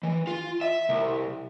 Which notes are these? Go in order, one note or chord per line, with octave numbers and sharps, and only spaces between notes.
E3
F4
E5
C2